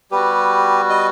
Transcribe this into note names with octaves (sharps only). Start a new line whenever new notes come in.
G3 B3 F#4 G4 B4
B4 D#5